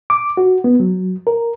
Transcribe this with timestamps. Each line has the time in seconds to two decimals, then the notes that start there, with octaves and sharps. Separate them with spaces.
0.10 D6
0.37 F#4
0.64 B3
0.80 F#3
1.27 A#4